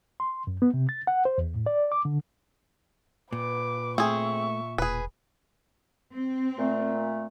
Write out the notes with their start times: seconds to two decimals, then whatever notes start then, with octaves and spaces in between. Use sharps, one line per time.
0.20 C6
0.47 F#2
0.62 B3
0.74 C3
0.89 A6
1.07 F#5
1.25 C5
1.38 E2
1.55 A2
1.66 D5
1.92 D6
2.05 D3
3.32 A#2 B4 D6
3.98 A3 C4 G#4 E5 C#6
4.78 E1 G#4 B4
6.13 C4
6.58 A#2 A3